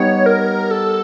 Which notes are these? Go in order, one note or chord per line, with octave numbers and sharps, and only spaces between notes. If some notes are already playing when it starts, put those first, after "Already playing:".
Already playing: G3 B3 D#4 G4 C#5
A#4
A4